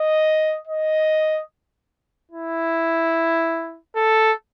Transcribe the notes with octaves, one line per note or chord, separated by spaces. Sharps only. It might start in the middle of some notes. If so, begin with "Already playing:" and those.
Already playing: D#5
D#5
E4
A4